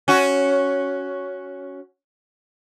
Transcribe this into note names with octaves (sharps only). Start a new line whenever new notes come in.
C#4 F#4